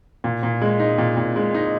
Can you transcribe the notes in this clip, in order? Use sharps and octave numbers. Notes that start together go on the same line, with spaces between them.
A#2
A#2
G#3
D#4
A#2
A#2
G#3
D#4